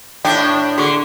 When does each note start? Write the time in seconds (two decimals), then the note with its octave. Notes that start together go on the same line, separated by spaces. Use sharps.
0.25 A2 D4 G5
0.78 D3 F#4 G#4 C#6